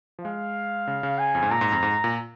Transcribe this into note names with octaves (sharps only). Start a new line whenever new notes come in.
F3
G#3 F5
C#3
C#3
G#5
F2
G#2
A#2 A#5
G#2
F2
G#2
A#2